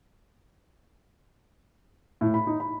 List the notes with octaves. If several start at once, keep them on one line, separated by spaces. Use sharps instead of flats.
A2
B5
D#4
B5